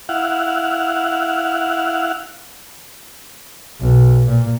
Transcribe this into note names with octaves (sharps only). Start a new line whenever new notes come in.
E4 F5 F#5
B1
A#2